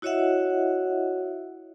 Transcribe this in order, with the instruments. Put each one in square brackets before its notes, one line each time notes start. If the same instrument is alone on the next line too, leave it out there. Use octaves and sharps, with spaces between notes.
[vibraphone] E4 F#4 C#5 D#5 E5 F#5